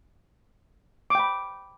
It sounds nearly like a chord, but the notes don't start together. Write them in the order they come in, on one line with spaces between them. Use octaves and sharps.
D6 G5 B5